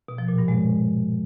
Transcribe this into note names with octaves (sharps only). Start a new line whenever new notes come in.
B2
F3
A#2
G2
G#3